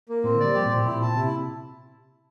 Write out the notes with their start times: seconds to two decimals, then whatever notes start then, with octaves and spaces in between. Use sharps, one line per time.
0.09 A#3
0.24 A2 C4
0.35 D3
0.40 G3 D5
0.55 F3 G4
0.65 A#2
0.70 C4
0.76 A2
0.85 A#2 E4
1.01 A#2 A5
1.17 C3 E4